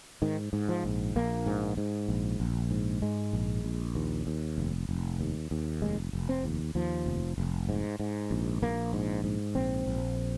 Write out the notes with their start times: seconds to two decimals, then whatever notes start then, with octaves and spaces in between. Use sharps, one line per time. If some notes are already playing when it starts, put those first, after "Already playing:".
0.22 G#2 D#3
0.53 G#2
0.69 F3
0.84 A#1
1.16 A#1 A#3
1.46 G#2
1.77 G#2
2.09 A#1
2.40 A#1
2.71 G#2
3.02 G#2 G#3
3.33 A#1
3.64 A#1
3.95 D#2
4.27 D#2
4.58 F1
4.89 F1
5.19 D#2
5.51 D#2
5.82 F1 G#3
6.13 F1
6.29 C4
6.44 D#2
6.75 D#2 F3
7.06 F1
7.38 F1
7.69 G#2
8.00 G#2
8.31 A#1
8.62 A#1 A#3
8.93 G#2
9.24 G#2
9.55 A#1 C4
9.86 A#1